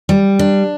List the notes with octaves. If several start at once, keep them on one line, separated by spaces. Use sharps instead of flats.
G3
D4